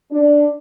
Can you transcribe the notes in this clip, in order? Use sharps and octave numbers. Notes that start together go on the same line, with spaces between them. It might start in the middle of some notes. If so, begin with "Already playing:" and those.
D4